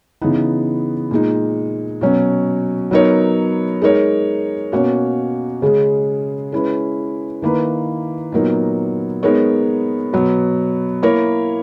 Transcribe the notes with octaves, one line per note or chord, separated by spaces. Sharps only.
C#3 E3 B3 D#4
A#2 G#3 D#4
B2 F#3 C#4
F#3 B3 D#4 A#4 C#5
G#3 D#4 A#4 C#5
B2 A#3 C#4 F#4 C#5
C#3 G#3 C#4 G#4
G#3 C#4 E4 B4
D#3 A#3 E4 B4
A#2 F#3 B3 D#4 A#4
G#3 B3 D#4 A#4 C#5
B2 F#3 B3
A#3 E4 A#4 C#5